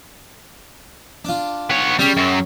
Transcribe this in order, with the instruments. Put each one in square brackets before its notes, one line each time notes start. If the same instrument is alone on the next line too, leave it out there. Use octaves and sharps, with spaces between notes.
[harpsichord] D4 F4
[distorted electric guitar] B3 C#5
[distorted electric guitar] G3 [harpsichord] C#4 G#4 G5
[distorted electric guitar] F#2 F#3